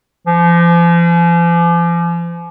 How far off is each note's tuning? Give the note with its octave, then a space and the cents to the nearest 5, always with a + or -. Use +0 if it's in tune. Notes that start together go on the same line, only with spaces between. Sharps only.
F3 -40